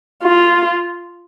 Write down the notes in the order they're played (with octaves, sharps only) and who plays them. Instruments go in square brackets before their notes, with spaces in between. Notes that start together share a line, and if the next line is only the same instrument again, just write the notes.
[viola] F4